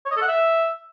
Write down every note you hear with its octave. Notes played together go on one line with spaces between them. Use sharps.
C#5
D#5
A4
F#5
E5